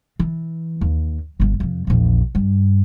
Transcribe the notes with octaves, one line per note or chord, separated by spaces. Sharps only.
E3
D#2
G1 G2
F2 C3
A#1 E2
G2